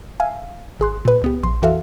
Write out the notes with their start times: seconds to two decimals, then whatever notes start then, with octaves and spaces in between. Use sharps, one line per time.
0.20 E5 F5 G#5
0.80 G#1 G#4 C6 F#6
1.05 A#2 B4
1.22 C#2 B3 G4
1.43 A#1 C6
1.62 F2 E3 F#4 A4 E5 F5